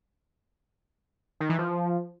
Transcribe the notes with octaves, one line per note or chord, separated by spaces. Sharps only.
D#3
E3
F3